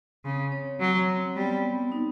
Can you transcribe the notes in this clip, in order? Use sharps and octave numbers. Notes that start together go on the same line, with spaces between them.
C#3 C4
C#5
F#3 C4
C4
G3 B3
B3
D#4